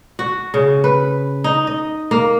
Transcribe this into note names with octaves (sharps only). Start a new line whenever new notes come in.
F#4
C#3
B4
D#4
D#5
A#3